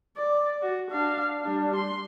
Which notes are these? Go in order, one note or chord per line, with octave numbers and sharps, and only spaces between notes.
D5
F#4
D4 F5
G3 D4
C6